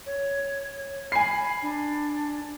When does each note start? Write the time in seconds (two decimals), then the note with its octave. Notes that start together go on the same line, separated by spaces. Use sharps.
0.06 C#5
1.12 G#5 B5 C7
1.62 D4